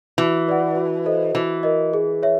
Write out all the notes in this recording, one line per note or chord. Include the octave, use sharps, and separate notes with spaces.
E3 F#4
B4 D5 F#5
F#4
A4 C5 D#5
E3 F#4
A#4 D#5
G#4
C#5 E5